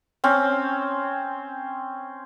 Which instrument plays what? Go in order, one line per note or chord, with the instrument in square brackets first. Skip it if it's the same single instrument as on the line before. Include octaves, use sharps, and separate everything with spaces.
[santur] C4 C#4